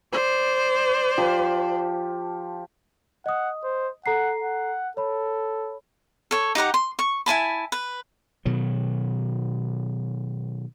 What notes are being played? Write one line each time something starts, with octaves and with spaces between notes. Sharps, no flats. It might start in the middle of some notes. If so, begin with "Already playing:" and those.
C5 D5
F3 G4
D#5 F#5 D#6
C5
A4 F#5 A#5 C7
F#5
A4 C#5 B5
A4 C#5
D#4 G4 F#5 A#5
C6
C#6
E4 G#5 A5 B5
B4
B2 D#3 F#3